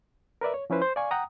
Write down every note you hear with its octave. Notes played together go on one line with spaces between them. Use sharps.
A#4 B4 D5 E5
C#5
F3 C#4 E4 B4 C5
C5
D5 F5 G#5 C#6
F#5 G5 A#5 D#6